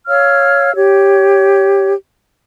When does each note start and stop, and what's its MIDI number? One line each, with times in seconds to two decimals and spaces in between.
0.06 0.73 73
0.06 0.73 77
0.06 0.73 88
0.06 0.73 89
0.75 1.93 67
0.75 1.93 73